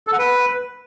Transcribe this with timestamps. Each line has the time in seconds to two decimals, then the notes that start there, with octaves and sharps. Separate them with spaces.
0.07 A4
0.13 F#5
0.19 B4